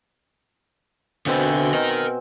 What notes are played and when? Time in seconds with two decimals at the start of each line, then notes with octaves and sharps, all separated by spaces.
1.26 B2 D3 C4 C5 G#5
1.74 A#4 D#5